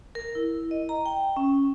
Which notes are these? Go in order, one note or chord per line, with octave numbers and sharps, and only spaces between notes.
A#4
E4
D#5
A#5
G5
C#4